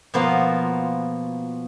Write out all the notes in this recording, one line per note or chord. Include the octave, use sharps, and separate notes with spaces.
B2 F3 A#3 B3 F4